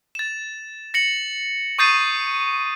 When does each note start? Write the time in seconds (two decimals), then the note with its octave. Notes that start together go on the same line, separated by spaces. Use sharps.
0.15 A6 E7
0.94 A#6 C#7 F#7
1.79 C#6 D#6 G6 A6 C7 D#7